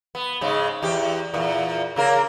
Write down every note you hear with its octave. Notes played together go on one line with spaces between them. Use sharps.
B3
G#2 C#3 G#3
E2 G4
E2 A#2
C#3 A#3 A#4